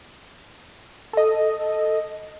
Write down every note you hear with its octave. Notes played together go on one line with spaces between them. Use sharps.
A4 D#5